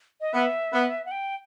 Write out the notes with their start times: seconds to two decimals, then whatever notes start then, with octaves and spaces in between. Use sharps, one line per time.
0.21 D#5
0.33 B3 E5
0.72 B3
1.06 F#5
1.11 G5